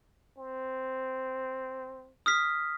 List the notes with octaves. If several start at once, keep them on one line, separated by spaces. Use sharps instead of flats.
C4
D#6 F6 B6